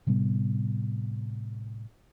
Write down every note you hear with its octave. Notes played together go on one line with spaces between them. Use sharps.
A2 C3 G3 B3